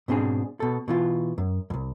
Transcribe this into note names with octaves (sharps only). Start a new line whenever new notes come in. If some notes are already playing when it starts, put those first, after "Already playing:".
G#2 B2 C4 D4 G#4
B2 A4
B2 E3 F4
F#2
C2 F2